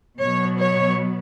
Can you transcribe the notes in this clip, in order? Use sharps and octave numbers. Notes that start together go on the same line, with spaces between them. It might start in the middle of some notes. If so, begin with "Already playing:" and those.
B2 F#3 B3 C#5
C#5